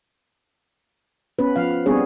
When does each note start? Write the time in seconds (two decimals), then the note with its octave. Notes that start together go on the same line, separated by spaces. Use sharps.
1.39 B3 C#4 B4
1.56 F3 F5
1.86 G3 B3 C4 D4 G#4 C#5